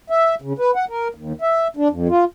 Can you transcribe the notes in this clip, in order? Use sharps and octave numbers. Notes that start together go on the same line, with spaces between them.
E5
C#3
B4
F#5
A#4
D#2
E5
D4
F2
F4